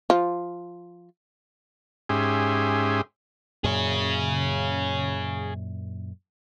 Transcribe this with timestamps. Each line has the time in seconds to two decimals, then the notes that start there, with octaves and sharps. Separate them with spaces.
0.10 F3 F4
2.09 G#2 C#4 G4 G#4 E5 C6
3.64 F#2 A#2 G#4 C#5